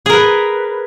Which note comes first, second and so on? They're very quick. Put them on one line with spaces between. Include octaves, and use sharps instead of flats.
G#4 A#4 B4